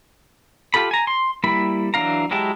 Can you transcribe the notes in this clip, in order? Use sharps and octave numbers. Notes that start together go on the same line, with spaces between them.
F4 G4 A4 B5
G#5 A#5
C6
G3 A#3 E4 B5
E3 F#3 D4 F5 A#5
F#3 G#3 E4 G4 A5